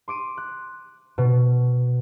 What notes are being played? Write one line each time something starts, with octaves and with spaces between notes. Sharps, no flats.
C6 D6 D7 D#7
F#6
B2